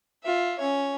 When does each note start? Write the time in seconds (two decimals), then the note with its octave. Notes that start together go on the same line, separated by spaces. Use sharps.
0.24 F4 E5
0.59 C#4 C#5